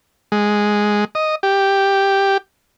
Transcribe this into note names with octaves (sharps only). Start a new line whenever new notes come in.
G#3
D#5
G4